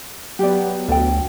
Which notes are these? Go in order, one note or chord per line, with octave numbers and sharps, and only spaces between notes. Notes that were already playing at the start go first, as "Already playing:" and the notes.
F#3 B3 G4 D5
D2 A4 G5